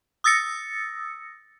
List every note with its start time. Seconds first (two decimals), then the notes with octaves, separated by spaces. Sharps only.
0.24 D#6 E6 A6 A#6 C#7